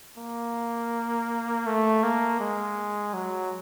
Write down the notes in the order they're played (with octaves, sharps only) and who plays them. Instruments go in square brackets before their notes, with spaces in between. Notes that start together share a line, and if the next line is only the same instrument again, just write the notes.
[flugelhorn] A#3
A3
A#3
G#3
F#3